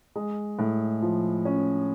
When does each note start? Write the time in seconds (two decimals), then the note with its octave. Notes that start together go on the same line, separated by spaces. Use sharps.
0.15 G#3
0.59 A2
1.02 F3
1.45 C#4